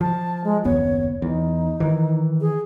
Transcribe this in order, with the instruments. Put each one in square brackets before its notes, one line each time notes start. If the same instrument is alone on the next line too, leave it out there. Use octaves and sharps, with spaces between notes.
[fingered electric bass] F3 [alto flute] A5
[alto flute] G#3
[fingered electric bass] F#1 D#2 B3 [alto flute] C#5
[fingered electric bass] E2 [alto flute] D#4
[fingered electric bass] D#3 E3
[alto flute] G#4